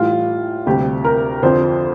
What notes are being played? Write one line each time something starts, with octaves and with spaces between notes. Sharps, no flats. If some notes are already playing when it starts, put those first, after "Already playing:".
Already playing: A2 E3 G3 F4
D2 C3 G3 G4
A#4
F2 D3 F3 C5